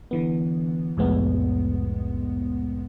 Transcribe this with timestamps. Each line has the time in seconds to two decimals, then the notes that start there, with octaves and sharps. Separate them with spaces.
0.11 D3 E3 B3
0.97 C2 F2 A2 G#3 B3